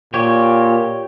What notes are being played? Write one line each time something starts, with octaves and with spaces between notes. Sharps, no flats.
A#2 G4 C#5